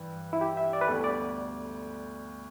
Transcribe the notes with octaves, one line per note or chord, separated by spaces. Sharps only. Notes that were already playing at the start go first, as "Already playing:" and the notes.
Already playing: G2 E3 B4
E4
G4
E5
D5
B4
D2 D3 G3 B3 A4
D5